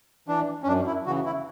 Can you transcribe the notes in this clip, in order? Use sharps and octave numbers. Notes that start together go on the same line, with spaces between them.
E3 D4
C#4
F#2 D4
E4
C#3 E3 F#4
E4